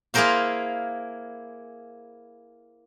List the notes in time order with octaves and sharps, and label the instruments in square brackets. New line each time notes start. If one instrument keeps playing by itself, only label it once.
[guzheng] A#3 E4 G#4 A#4 C5 F5